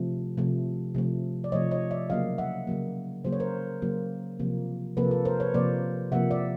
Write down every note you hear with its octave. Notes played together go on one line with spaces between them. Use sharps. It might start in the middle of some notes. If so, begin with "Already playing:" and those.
Already playing: C3 F3 A3
C3 F3 A3
C3 F3 A3
D5
C3 F3 A3 C#5 D#5
C#5 D#5
D5 E5
C#3 F#3 A#3 D#5 F5
E5 F#5
C#3 F#3 A#3
C#3 F#3 A#3 C5
C#5
A#4 C5
C#3 F#3 A#3
C3 F3 A#3
C3 F3 A#3 A4 B4
A4 B4
A#4 C5
B4 C#5
C3 F3 A#3 C5 D5
C3 F3 A#3 E5 F#5
D5 E5